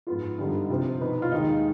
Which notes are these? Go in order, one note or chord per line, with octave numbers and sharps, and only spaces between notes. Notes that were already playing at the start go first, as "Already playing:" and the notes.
G#2 F3 B3 F4
G2 D3 G3 B3 D#4
C3 F3 C4 F4 C5
B2 B3 D#4 B4
F4
D#2 D#3 G#3 D#4